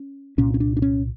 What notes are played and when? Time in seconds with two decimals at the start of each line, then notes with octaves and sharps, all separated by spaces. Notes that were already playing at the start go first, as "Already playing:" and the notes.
Already playing: C#4
0.38 C2 A#2 C#4
0.54 C#4
0.60 D4
0.77 D4
0.82 C#4